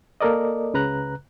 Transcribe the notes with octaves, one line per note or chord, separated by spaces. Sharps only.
A#3 A4 A#4 D5 D#5
C#2 C#3 B4 A#5 F#6